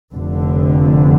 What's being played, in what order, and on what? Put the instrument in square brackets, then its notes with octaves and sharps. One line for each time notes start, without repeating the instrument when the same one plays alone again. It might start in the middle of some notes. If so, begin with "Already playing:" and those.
[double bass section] F1 F2 D3